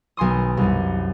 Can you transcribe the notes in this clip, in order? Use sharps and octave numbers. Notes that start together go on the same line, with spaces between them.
B1 G#5 C6 D#6
C2 F#2